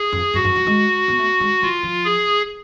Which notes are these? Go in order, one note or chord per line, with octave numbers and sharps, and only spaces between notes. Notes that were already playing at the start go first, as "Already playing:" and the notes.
Already playing: G#4
F2
F#2 F#4
F#2
F3
G#3
B3
A3
G#3
F#3 F4
F3
G#4